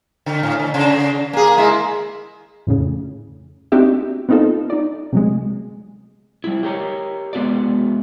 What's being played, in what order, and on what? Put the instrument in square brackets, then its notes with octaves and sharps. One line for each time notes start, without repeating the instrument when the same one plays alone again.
[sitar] D3
A2
D3
C#3
A#3 G#4
G#3 A#3 E4
[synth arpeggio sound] F2 A2 C#3
C4 D4 D#4 F#4 G4 E5
B3 C4 D#4 F4 A4
D#4 D5
C3 F#3 G#3
[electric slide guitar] G3 E4
G4 A#4 C#5
G#3 B3 F#4 D5